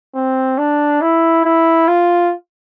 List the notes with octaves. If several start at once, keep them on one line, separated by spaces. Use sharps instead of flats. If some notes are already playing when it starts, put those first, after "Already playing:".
C4
D4
E4
E4
F4